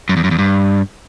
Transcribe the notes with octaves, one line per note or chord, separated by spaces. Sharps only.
F#2
E2
F#2
E2
G2